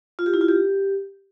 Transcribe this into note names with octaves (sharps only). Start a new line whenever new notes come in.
F4
G4
E4
F4
G4